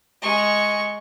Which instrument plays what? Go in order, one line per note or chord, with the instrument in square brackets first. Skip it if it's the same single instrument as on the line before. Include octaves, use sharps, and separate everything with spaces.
[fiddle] G#3 C#6